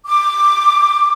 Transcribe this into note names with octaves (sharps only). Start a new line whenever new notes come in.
D6